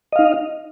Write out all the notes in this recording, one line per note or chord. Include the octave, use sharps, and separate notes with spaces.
D#4 D#5 F5